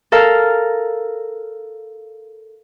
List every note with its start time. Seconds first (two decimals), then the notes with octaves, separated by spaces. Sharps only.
0.12 A4 A#4 F5